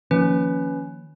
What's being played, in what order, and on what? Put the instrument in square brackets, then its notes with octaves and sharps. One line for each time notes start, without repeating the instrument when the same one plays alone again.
[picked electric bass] D#3 F3 A#3 [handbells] C#4 B4